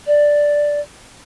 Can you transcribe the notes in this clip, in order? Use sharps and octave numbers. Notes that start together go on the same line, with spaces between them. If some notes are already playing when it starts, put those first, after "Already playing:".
D5